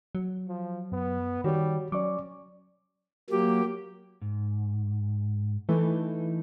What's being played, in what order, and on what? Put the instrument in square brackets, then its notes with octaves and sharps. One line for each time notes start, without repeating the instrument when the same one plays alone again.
[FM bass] F#3
[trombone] F3
[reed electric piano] F#2 [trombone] B3
[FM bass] D#3 [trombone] G3 [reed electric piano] F#4 C#5
[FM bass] F#3 [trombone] C#4 [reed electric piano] D5 C#6 D6
[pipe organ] F#3 A#3 [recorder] G4
[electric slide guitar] G#2
[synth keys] E3 A3 [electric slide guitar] D#4